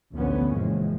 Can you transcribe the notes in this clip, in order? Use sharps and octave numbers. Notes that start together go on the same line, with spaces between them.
A1 D2 D3 F3 B3 C#4
F#1 A#2 E3 F3 G#3